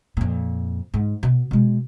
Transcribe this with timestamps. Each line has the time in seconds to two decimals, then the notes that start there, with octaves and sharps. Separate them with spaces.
0.17 F2 A#2
0.94 G#2
1.23 B2
1.51 B2 G#3